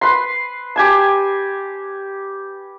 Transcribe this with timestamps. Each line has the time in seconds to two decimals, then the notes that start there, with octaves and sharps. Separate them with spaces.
0.01 B4 C6
0.76 G4 G#5 A5